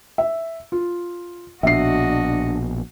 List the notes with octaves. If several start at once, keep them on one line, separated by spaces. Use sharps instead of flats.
E5
F4
A#1 B2 D4 F#4 D#5 E5 C7